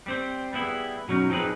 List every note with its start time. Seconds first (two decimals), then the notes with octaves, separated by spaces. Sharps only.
0.06 G3 C4 C5
0.53 G3 B3 E4 G#4
1.08 B2 F#3 C#4 D#4
1.29 F3 C4 D#4 G#4 B4